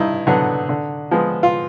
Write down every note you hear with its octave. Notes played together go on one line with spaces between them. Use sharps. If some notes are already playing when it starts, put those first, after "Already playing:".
Already playing: G2 D#4 E4
D3 F#3 B3
D3
F3 G#3 B3
F4